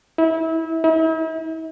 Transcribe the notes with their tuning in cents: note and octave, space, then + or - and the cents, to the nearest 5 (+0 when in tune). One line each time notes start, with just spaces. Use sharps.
E4 -25
E4 -40